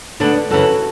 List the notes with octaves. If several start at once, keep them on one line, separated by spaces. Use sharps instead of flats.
D2 D3 B3 D4
F#2 C#3 E3 F#4 A4